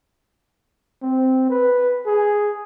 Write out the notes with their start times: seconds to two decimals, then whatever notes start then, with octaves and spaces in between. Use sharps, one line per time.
1.02 C4
1.50 B4
2.07 G#4